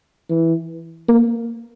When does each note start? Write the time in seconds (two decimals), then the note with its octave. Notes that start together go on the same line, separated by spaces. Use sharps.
0.30 E3
1.08 A#3